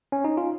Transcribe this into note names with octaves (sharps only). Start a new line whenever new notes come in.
C#4
D#4
F4